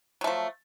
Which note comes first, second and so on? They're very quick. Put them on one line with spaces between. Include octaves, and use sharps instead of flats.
F#3 A3 F3